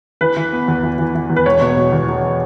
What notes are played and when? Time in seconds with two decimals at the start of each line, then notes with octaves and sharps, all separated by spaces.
0.21 E3 B4
0.37 E3
0.53 B3
0.68 E2
0.83 E3
0.98 E3
1.15 E3
1.30 E2
1.36 B4
1.46 E1 C#5
1.61 B2
1.77 B2
1.92 E2
2.08 E1